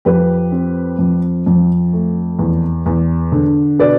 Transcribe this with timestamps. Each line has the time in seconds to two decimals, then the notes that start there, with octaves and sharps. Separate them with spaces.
0.05 F2 G4 B4
0.52 C4
0.98 F2
1.46 F2
1.93 A3
2.39 E2
2.86 E2
3.32 D3
3.79 B2 B4 D5